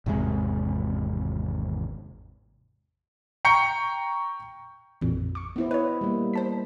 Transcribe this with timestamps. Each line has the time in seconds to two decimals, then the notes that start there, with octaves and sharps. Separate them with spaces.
0.06 G#1 E2 C3 G#3
3.45 G5 A#5 C#6 G6 C#7
5.01 A1 F2 A#2
5.35 C#6 D6
5.56 B3 E4 C5
5.71 B4 C#5 D#5
6.01 G3 A#3
6.34 C5 A5 B6